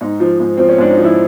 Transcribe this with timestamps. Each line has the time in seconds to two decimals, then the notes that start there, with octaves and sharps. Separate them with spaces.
0.01 G#2 D#4
0.20 F3
0.40 G#2
0.57 F3 C4
0.69 C#4
0.78 G#2 D4
0.91 D#4
0.98 F3
1.04 E4